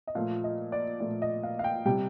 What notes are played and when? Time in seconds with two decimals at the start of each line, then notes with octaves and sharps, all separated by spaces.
0.07 D#5
0.15 A#2 F3 A3 F5
0.44 D#5
0.72 D5
1.00 A#2 F3 A3 D5
1.22 D#5
1.43 F5
1.59 F5
1.64 G5
1.85 C3 G3 G5